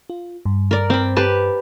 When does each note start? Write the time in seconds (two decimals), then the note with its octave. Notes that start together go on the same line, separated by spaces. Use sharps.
0.10 F4
0.45 G2
0.71 A#4 D5
0.90 C4 B5
1.16 G4 B4 A5